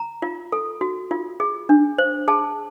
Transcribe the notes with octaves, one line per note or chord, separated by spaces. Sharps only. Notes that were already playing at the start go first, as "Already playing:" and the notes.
Already playing: A#5
F4
A4
F#4
F4
G#4
D4
C5
G#4 A5